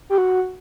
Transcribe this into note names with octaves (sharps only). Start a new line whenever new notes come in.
G4
F#4